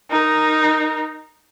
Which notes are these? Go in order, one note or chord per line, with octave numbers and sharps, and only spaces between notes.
D#4 A#4